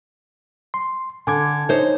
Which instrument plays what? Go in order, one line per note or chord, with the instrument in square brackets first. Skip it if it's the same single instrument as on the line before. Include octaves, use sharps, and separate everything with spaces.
[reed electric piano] C6
[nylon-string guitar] D3 [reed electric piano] G#5 D6 G#6
[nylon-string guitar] D#4 C5 C#5